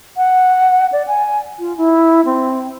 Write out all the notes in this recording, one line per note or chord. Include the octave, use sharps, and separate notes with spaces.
F#5
D5
G#5
F4
E4
C4